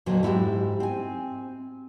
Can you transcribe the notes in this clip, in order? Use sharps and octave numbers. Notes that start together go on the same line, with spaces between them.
F2 A#2 D3 F#3
G#2 E4 F#4 G4
C4 G#5